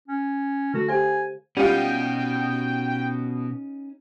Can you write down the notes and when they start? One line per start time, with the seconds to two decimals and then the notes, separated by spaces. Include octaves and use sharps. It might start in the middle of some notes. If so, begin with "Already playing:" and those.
0.08 C#4
0.74 D3 A3 F#4 A4
0.88 G4 C5 F5 G#5
1.57 B2 G3 C#4 D#4 F4 F#5 G5